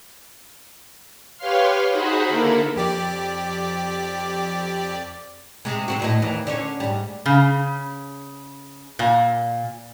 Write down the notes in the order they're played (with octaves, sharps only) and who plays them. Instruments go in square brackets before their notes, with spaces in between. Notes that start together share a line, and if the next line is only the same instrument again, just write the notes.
[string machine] G4 B4 C#5 F5 C6 F6
D#4 F#4 G#4 C5 F#5 B5
D3 A#3 E4 A4 A#4
[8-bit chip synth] F2 G4 D5
[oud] C3 G#3
F#3 C4 F#4
D2 A2 D#5
D#2 E3
D3 C#4 C#5
G#2 G3
[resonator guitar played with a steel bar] C#3
A#2